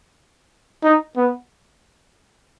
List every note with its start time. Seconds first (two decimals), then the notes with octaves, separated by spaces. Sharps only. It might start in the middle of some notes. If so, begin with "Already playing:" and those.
0.83 D#4
1.17 B3